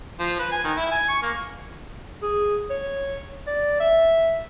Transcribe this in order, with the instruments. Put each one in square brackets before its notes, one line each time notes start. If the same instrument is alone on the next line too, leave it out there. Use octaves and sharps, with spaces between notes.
[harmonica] F3
B4
G#5
D#3
E4
G#5
C#6
A#3
[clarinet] G#4
C#5
D5
E5